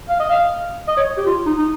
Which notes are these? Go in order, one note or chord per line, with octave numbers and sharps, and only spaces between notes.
F5
D#5
F5
D#5
C#5
G4
F4
D#4
D#4